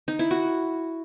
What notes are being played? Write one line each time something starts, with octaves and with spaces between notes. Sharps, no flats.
D#4
E4
F#4